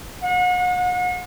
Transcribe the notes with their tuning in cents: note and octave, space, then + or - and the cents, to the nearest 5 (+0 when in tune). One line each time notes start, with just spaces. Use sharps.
F#5 -40